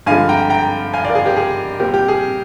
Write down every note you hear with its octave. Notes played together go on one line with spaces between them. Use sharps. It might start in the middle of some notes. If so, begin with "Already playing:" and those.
G2 D3 F3 G#3 C4 F5 G#5
G5 A#5
G5 A#5
F5 G#5
D5 F5
A#4
G#4
G4 A#4
G#4
A#2 G3 C4 G4 A#4
G4
G#4